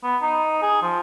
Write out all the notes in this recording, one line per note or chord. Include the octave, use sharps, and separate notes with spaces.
B3
D#4
G#4
F3